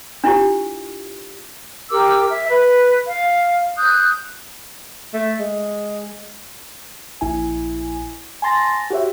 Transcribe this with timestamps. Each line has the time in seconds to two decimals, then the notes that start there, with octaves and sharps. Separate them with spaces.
0.24 D4 E4 F4 G4
1.91 G4 A#4 D6 E6
2.29 E5
2.49 B4
3.07 F5
3.78 D#6 F#6 G6
5.14 A3
5.40 G#3
7.21 A#1 E4 G#5
8.42 G#5 A5 C6 A6 A#6
8.90 F#4 G4 C#5 E5